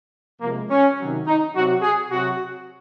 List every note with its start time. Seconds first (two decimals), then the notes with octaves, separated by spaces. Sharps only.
0.41 C3 F3 G#3 A#3
0.70 C#4
0.97 C3 D#3 F#3
1.26 D#4
1.54 C3 F#3 F#4
1.82 G#4
2.11 C3 F#3 F#4